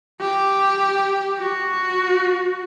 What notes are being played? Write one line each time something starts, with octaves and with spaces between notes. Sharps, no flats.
G4
F#4